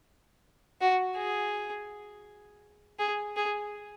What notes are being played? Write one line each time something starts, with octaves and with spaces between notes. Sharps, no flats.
F#4
G#4
G#4
G#4